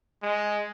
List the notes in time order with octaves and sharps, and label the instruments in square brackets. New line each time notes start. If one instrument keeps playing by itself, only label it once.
[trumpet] G#3